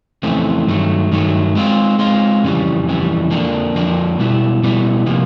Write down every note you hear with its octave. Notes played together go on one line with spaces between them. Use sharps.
F2 C#3 E3 A3 C4
G2 D#3 F#3 A3
G2 D#3 F#3 A3
G#3 C4 F4
G#3 C4 F4
F2 C#3 E3 G3
F2 C#3 E3 G3
F2 D3 F3 A#3 D4
F2 D3 F3 A#3 D4
B2 G3 B3 E4
B2 G3 B3 E4
C3 F3 A#3